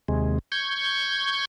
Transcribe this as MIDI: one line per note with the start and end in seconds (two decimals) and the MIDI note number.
0.08 0.39 39
0.08 0.39 48
0.08 0.39 56
0.52 1.45 85
0.52 1.45 91
0.52 1.45 92